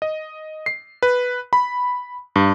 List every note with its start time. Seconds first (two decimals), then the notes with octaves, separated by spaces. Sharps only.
0.02 D#5
0.66 C7
1.03 B4
1.53 B5
2.36 G2